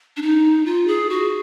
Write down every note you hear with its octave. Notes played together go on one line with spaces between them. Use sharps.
D4
D#4
F4
G#4
F#4